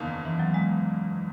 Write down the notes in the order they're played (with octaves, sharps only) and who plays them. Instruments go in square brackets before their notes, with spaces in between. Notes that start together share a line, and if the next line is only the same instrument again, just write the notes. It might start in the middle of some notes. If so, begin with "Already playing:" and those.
Already playing: [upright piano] F#1 E2 D#3 A#3
[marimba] E3
F#3
G#3